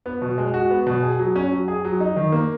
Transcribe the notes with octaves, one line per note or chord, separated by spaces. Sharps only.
B3
B2
G#3
F#4
B3
B2
G#4
F#3
C#4
F#3
G#4
F#3
D#4
D#3
A#3